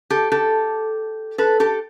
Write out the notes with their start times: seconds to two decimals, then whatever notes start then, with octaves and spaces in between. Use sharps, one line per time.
0.10 G4 A4
0.32 G4 A4
1.38 A4 B4
1.60 G4 A4